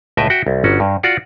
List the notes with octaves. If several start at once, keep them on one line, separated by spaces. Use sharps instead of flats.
C#2 A2 B4 D#5 E5 G5
F#4 E5 G5
C2
G1 C#4 F#4
G2
F4 F#4 D5 F#5